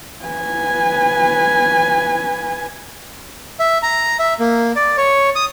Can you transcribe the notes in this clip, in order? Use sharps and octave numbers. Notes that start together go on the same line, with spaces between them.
B4 G#5
E5
A#5
E5
A#3
D5
C#5
D#6